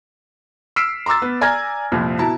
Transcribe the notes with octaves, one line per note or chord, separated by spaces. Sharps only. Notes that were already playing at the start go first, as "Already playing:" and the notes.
E6 F6 B6 C7 D7 E7
A#5 C6 D6 E6 A6
B3
D5 G#5 A#5 F6 G#6 A#6
C2 F2 A#2 F3
B2 E4 A5 A#5